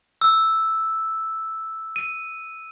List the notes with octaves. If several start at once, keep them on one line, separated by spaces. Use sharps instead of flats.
E6
D#7